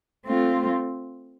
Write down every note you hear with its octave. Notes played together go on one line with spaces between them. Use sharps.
A3 C4 F4